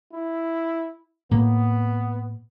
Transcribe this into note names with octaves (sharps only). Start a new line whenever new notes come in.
E4
A2 A#3 B3